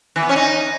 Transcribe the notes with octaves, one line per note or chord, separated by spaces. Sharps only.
E3
B3
C#4
D#4